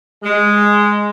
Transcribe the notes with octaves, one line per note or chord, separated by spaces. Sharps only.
G#3